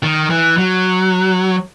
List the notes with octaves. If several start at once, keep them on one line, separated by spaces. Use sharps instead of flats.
D#3
E3
F#3